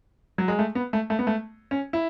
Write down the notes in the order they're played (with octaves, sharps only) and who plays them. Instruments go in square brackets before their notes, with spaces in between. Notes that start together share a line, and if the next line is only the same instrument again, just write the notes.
[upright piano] F#3
G#3
A3
B3
A3
A3
B3
A3
C#4
E4